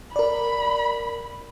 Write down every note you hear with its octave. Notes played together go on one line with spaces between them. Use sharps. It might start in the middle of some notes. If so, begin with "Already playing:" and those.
A#4 D5 B5